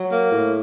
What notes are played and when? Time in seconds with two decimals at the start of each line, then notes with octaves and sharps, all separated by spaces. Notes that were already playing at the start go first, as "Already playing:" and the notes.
Already playing: F#3
0.12 A#3
0.32 A2